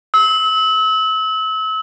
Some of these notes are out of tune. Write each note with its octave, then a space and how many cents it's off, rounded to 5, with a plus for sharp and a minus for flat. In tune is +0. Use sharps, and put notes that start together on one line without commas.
E6 -35